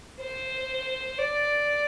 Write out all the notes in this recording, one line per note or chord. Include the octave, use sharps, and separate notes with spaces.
C5
D5